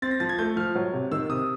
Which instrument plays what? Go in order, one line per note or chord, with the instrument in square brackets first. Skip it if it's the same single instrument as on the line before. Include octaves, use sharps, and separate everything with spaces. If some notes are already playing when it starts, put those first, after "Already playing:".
[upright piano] C4 [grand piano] A6
[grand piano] A#6
[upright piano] F3 [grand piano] A6
[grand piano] G#6
[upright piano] A3 [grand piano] G6
[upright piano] F3 [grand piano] F6
[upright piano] F#3
C3
[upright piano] D#3 [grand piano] E6
[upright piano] C3 [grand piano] D#6